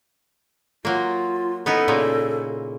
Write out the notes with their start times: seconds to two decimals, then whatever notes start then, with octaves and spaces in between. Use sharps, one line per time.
0.85 F#3 A#3 F4
1.66 B3 D#4 E4 A4
1.88 A#2 C#3 A#3